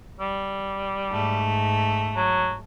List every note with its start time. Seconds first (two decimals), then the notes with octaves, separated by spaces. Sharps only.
0.20 G3
1.09 G#2 A3
2.16 F#3